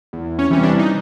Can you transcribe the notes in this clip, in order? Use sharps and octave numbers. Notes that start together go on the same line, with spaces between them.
E2
C#4
C3 E3 G3 C#4
D4
D#4